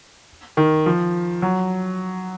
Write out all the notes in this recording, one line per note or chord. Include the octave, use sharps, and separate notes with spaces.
D#3
F3
F#3